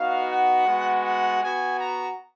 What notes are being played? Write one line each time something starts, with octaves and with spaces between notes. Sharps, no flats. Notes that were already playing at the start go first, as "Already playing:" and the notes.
Already playing: B3 D#4 F#4 F5
F#5
G#3 B3 F#4
F#5
B3 F#4 G#5
A#5